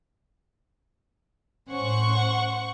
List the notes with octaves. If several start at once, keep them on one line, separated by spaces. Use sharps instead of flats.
A2 C#4 C5 F#5 C#6